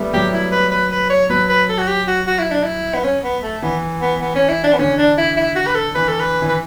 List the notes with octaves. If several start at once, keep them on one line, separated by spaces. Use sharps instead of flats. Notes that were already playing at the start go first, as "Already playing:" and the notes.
Already playing: G3 A3 B3
F#3 G4
E4
B4
B4
B4
C#5
F#3 B4
B4
A4
F#4
G4
F#4
F#4
E4
D4
E4
B3
C#4
B3
A3
E3 B3
B3
B3
C#4
E4
D4
B3
D3 C#4
D4
E4
E4
F#4
B4
A4
E3 B4
A4
B4
E3
B4